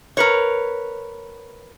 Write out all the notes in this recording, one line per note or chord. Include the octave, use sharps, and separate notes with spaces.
A#4 B4 C#5